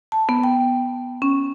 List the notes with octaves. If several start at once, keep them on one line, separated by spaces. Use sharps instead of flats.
A5
B3
G5
C#4